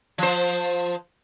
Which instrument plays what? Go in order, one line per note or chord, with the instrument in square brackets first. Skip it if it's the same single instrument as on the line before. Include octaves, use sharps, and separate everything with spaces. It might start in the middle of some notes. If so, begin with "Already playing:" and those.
[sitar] F3 C5